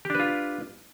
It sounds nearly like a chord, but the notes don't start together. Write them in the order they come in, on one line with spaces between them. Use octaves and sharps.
G4 D4 B4 F4